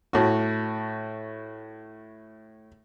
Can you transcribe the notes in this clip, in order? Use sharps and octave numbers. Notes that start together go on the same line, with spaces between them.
A2 F#4